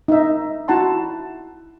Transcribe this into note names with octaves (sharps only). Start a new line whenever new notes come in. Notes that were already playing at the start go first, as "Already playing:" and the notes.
D#4 E5
E4 F#4 F#5 A5 A#5 C6